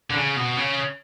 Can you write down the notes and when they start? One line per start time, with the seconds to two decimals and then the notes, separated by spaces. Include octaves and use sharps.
0.10 D3
0.15 C#3
0.36 B2
0.57 C#3